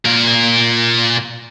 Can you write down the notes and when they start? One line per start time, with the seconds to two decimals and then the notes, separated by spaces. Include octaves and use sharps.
0.05 A#2 A#4